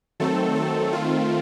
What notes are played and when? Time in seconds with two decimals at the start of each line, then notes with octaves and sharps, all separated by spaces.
0.20 D#3 F#3 A3 C4 A4
0.56 A4
0.93 D#3 A3 C4 F4